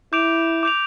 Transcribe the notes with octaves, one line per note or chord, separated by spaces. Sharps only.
E4 D6 G6 D7 F7
D6 G6 D7 F7